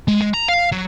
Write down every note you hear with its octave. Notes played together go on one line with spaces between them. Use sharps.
G#3
G#3
A#5
F5
F#3